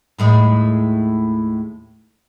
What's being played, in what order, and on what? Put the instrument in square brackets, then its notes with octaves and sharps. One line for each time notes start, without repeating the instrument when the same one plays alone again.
[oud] D#2 A2 G#3